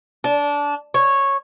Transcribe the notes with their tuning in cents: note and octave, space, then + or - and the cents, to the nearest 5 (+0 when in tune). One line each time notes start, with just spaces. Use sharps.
D4 -20
C#5 -10